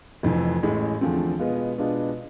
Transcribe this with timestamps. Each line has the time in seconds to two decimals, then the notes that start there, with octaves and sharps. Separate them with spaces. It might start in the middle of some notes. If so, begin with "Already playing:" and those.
0.23 F1 F2 E3
0.63 A1 A2 G#3
1.01 E2 D3 F3 A3 C4
1.39 B2 G#3 B3 F4
1.78 B2 G#3 B3 D4 F4